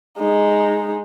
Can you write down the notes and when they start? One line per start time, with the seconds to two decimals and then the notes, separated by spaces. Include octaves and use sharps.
0.18 G#3 D#4